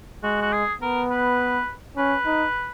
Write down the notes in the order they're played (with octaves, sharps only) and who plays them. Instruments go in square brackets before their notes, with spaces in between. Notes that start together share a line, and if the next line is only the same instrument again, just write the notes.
[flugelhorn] G#3 [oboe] F#4
[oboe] F#4
G#4
[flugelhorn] B3 [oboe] A#4
[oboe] B4
[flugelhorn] C#4 [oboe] B4
[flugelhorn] D#4